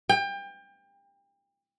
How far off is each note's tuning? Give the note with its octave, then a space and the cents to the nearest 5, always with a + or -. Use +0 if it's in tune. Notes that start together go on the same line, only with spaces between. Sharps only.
G5 +30